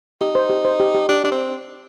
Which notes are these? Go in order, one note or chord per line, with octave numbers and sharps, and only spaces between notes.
D#4 G4
C5
G4
C5
G4
G4
D4 G4
D4 G4
C4